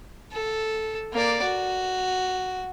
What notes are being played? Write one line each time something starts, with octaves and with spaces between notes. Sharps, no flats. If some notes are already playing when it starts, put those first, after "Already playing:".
A4
A#3 D5
F#4